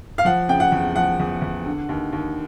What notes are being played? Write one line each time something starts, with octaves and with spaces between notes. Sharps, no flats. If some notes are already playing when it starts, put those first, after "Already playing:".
F5
F3 F#5
C#3 G5
F#5
E2
F3 F#5
E2
E2
D3
D#2
D#2